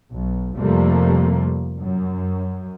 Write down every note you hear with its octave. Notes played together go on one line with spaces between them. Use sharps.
B1
F2 C3 G3 A3 A#3
F#2